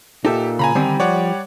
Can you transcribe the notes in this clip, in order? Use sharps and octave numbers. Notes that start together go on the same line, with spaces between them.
A#2 D#4 G4 A4 E5
C#3 G#5 A#5 B5
D3 D#3 G3 C4
F3 C#5 D5 F#5